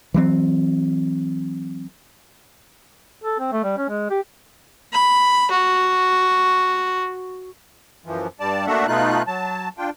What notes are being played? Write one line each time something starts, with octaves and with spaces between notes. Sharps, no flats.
E3 F#3 C4
A4
C4
A3
G3
C#4
G#3
G4
B5
F#4
F#2 E3 F3
G2 G3 D5 A5
A3 A#3 D4 F#4 E5 F#5
B2 A3 D#4 F4 F#6
F#3 A5
D4 F4 G5